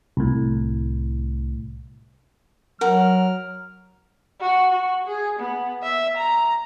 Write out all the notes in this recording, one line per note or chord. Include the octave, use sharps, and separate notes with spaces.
C2 A2
F#3 A#4 F#5 F6
F#4
F#4
G#4
B3
E5
A#5